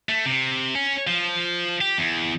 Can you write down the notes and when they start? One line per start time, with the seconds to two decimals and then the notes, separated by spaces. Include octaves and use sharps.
0.09 A3
0.26 C3
0.75 C#4
1.07 F3
1.81 G4
1.98 E2